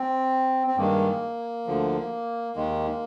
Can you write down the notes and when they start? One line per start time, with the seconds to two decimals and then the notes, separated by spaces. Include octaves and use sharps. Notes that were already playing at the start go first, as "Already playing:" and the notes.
Already playing: C4
0.67 C4
0.77 G2 D#3 G#3 A#3
1.67 D2 D3 F3
2.56 D#2 D#3 G#3